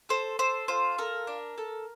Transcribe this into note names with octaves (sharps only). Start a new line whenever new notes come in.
A4 C5
A4 C5
F4 C5
A4 A#4
D4
A4